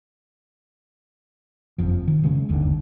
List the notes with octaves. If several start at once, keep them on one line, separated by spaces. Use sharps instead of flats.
F#1 F2 F3
D#3
C#3 G#3 B3 C#4
G1 D#2 D3